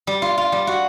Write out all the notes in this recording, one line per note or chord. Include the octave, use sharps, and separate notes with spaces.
G3
F4
F4
G3
F#4